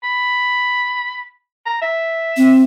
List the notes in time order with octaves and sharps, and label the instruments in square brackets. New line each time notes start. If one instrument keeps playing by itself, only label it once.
[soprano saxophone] B5
A#5
E5
[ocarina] C4